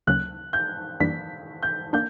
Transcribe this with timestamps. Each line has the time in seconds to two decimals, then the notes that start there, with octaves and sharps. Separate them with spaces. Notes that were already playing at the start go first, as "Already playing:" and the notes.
0.07 D2 C#3 F#3 A#3 C#4 F#6
0.53 G6
1.00 F#2 E3 G3 A#3 D4 B6
1.63 G6
1.93 A#3 D4 G6